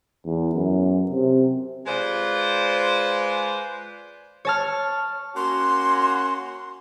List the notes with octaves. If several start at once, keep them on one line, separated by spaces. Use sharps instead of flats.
E2
F#2
C3
G#3 F4 B4 C5 D5
C#5 A5 F6
A#3 C#4 F#4 C6